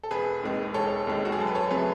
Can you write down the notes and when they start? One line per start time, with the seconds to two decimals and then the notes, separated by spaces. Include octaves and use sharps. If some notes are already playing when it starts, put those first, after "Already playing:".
0.03 A4
0.11 E1 G#4 B4
0.43 D#2 D#3 G#3
0.74 E1 A4 C#5
1.07 D#2 D#3 G#3
1.25 F#4
1.32 G#4
1.39 F#2 A4
1.47 B4
1.55 A4 C#5
1.70 C#3 F#3 A3 G#4 B4